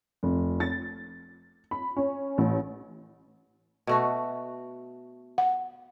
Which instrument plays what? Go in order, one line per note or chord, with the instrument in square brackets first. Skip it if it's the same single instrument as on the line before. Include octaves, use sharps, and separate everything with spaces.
[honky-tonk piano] F1
A6
B5
C#4
A1
[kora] B2 A3 F#4
[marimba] F#5